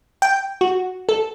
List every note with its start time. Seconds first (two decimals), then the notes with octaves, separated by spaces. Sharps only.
0.22 G5
0.61 F#4
1.09 A4